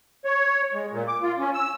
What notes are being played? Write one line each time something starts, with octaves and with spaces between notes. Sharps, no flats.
C#5
G#3
A#2
D6
F4
C#4
E6